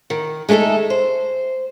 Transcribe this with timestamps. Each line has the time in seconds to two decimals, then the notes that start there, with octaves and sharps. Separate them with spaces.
0.10 D#3
0.49 G#3 A3 D4 D#4 A4
0.90 C5